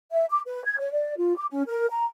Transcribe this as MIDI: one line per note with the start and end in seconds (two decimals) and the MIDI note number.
0.11 0.25 76
0.30 0.40 86
0.46 0.64 71
0.64 0.76 92
0.79 0.89 73
0.92 1.17 74
1.17 1.35 65
1.37 1.45 86
1.50 1.62 61
1.68 1.86 70
1.90 2.05 82